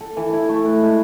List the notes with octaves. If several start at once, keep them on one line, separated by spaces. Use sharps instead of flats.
A4
E3
E4
A3
B4
G#3